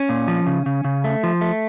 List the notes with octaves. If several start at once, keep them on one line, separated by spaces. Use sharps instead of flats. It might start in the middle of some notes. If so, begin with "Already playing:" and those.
Already playing: C#4
A#2
F3
C#3
C#3
C#3
A3
F3
A3